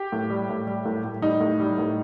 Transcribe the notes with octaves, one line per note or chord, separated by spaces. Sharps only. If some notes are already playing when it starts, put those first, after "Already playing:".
Already playing: G4
A2
G3
A2
G3
A2
A2
G3 D#4
A2
G3
A2